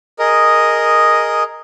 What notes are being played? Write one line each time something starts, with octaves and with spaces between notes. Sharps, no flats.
G#4 A#4 D#5